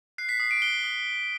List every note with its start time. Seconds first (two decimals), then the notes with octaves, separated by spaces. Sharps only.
0.18 F#6 C7
0.29 B6
0.40 D#6 C7
0.51 D7
0.62 F#6 G7
0.84 D#6